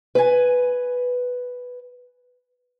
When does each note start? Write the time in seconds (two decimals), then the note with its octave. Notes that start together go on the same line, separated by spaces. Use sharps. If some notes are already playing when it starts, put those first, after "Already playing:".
0.15 B4 G#5